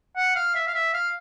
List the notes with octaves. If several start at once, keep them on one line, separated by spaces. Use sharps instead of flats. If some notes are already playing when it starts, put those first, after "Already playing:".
F#5
F5
E5
F5
E5
F5